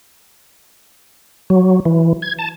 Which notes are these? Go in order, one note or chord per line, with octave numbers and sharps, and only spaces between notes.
F#3
E3
G#6
A5